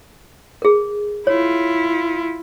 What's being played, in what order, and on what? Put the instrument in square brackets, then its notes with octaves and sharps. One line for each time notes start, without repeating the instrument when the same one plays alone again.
[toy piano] G#4 A#4
[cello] E4 F4 [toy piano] C#5